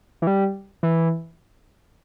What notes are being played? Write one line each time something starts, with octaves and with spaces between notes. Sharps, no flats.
E3
G3
E3